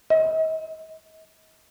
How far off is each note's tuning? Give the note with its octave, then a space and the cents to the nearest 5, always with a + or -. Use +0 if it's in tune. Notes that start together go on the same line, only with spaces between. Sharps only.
D#5 +40